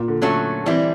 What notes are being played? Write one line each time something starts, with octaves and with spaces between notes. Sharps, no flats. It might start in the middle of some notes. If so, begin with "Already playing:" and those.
Already playing: A#2
D3
D3 F#3 A3 C#4 F#4 A4
D3 E3 G3 C4 E4